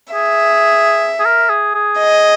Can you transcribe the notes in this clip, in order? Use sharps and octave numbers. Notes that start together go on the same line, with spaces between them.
G#4 E5
G#4
A#4
G#4
G#4
D#5